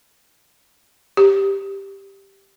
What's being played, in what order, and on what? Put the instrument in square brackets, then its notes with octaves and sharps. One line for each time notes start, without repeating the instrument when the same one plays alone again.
[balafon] G4